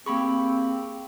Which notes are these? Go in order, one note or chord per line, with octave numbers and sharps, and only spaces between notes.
A#3 C4 G4 G#4 B5 C#6